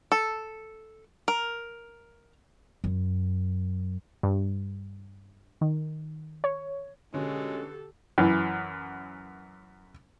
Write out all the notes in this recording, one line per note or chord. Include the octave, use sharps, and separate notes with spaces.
A4
A#4
F#2
G2
D#3
C#5
B2 D3 G#3 C#4 G4 A4
F#2 E3